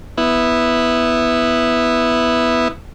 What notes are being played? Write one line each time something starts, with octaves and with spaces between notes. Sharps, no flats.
B3 E4